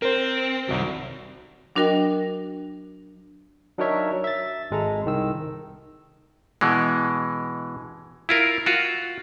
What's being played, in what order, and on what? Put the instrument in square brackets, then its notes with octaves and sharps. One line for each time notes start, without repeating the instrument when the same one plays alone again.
[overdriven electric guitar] C4 [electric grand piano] A#4 C5
[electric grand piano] C2 F#3 [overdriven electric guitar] F#2 D#3
[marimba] F#3 D4 F#4 A#4 D#5 G5
[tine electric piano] F#3 D4 D#4 A#4 C#5 E5
E5 A6
G#1 G#3 A4 A#5
C2 D#3 E6
[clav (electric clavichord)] B2 E3 G#3
E4 F4 A#4
F4 F#4